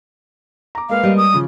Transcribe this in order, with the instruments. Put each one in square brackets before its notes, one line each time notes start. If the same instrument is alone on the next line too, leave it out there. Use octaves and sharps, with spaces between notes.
[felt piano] A#5 D6
[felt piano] G#3 A#3 B4 [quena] F5
[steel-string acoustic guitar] G3 G4 D#5
[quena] D#6
[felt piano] C#3 F3